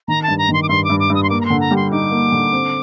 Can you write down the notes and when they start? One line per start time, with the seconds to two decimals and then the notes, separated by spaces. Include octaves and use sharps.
0.08 D#3 A#5
0.23 A5
0.28 G2
0.38 A#5
0.49 D#3 C6
0.63 D6
0.69 G2 C6
0.84 G2 D6
1.00 D6
1.10 G2
1.15 D#6
1.23 C6
1.30 A#3 D6
1.41 A#5
1.45 D3 C6
1.61 A#5
1.71 G3
1.76 C6
1.91 D#4 D6
2.11 A#3
2.32 D3
2.52 C4